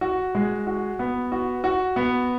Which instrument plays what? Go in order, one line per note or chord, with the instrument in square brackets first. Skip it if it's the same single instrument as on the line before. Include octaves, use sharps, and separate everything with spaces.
[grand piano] F#4
G#3
F#4
B3
F#4
F#4
B3